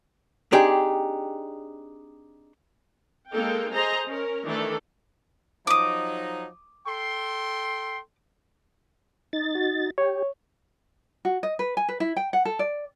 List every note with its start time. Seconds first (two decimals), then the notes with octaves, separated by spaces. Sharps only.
0.52 C4 D4 D#4 G4 G#4 G5
3.32 G#3 A#3 D#4 A4 F5 G5
3.72 G#4 A4 C5 D#5 G#5 A#5
4.06 C#4 A#4
4.45 D#3 E3 A3 D4 A4
5.67 F3 F#3 D#4 D6 D#6
6.87 A4 G5 C6
9.33 D#4 A6
9.55 F#4
9.98 G4 C#5
11.25 F#4
11.43 D#5
11.59 B4
11.77 G#5
11.88 B4
12.00 E4
12.16 G5
12.33 F#5
12.45 A4
12.59 D5